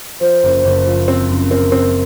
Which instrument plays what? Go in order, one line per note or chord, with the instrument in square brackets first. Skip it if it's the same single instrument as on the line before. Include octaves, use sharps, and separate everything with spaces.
[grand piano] F3 [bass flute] C5
[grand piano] F#1
F#1
F3
C4
F#2
[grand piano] C4 [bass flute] A#4
[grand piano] C4